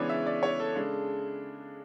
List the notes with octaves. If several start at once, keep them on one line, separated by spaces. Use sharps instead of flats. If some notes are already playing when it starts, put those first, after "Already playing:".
Already playing: C#3 E3 G#3 B3 D4 C#5 D5
E5
D5
C#5
A4
C#3 G#3 D4